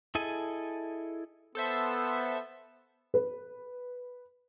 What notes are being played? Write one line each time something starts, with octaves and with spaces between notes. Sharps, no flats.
E4 G#4 A4 D#5 G#5
B3 A4 C5 E5
B4